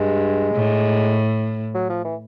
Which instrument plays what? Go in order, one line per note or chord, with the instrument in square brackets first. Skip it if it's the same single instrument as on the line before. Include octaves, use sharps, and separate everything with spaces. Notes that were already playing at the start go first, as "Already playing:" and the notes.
Already playing: [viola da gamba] G2 [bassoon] G#3
[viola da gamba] A2
[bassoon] F#3
F3
E3